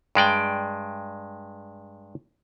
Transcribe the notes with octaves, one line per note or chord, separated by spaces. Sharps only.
G2 G#3 D5 G5